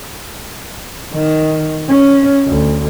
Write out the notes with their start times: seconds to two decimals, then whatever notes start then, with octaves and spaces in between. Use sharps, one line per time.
1.12 D#3
1.88 C#4
2.46 D2